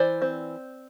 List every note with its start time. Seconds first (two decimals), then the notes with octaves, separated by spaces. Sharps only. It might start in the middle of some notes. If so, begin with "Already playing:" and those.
Already playing: E3 C5 D5
0.22 C4